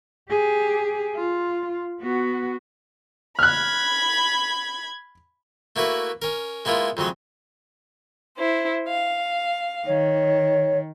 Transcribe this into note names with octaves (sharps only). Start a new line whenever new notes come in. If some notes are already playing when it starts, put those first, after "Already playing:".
G4 G#4
F4
B3 F#4
B5 F6 F#6 G#6
A3 A#3 E4 F#4 B4
C#4 A#4
G#3 A#3 B3 E4 F4
F2 C#3 F#3 G#3
E4 C5
F5
D#3 C#5